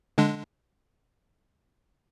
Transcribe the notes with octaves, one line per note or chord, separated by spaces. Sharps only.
D3 G#3 D4